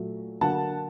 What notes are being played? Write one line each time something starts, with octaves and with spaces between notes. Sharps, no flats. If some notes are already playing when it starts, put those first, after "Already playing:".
Already playing: A#2 F#3 A3
D3 F#3 A#3 F#5 A5